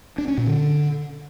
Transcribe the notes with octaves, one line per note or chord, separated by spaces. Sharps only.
D4
C#4
A#2
D3